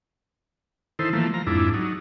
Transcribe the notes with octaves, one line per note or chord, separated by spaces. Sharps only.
D#3 E4 A4 C5
E3 F3 A3 A#3
F3 A#5
F2 G#2 D4 E4
F#3 D#4